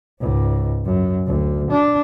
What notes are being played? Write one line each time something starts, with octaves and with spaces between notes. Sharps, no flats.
C#2 G#2
F#2
D2
D4